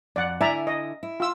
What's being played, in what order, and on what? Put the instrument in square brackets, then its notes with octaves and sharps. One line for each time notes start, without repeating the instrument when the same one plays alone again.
[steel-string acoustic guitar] F2 [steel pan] D5 F#5
[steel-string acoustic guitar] D3 E4 G#5 [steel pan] D5 E5 A#5
[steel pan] D#5
[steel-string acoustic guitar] E4
[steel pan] F4 E6